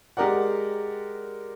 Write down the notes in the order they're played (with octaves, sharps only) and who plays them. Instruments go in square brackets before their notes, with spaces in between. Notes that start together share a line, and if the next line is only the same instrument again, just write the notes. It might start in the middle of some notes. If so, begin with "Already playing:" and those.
[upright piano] G#3 G4 A#4 D5 F#5